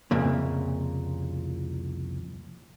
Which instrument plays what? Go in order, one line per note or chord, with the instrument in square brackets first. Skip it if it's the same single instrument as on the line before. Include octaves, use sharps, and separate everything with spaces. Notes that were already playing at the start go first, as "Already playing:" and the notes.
[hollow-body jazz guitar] C2 F2 A#2 C#3